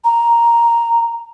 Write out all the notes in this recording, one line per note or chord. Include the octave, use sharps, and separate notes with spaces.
A#5